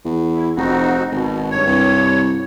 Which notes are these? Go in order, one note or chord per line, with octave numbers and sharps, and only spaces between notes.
E2
E4
F1 C4 D#4 F#4
G#1 B2
G2 C#5
C2